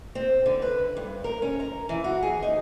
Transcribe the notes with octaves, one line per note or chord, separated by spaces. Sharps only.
C4
D3
B4
G2
A#4
C#4
A#5
E3
F#4
G#4
D#4